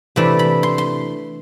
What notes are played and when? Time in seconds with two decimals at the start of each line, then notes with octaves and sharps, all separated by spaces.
0.16 C3 E3 A3 D4 B5
0.39 B5
0.63 C6
0.78 C6